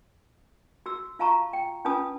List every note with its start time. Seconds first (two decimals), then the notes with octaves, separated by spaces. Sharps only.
0.86 F#4 E6
1.19 F4 F5 A5 A#5 C#6
1.53 G5
1.85 C#4 D4 F4 B4 A5 D#6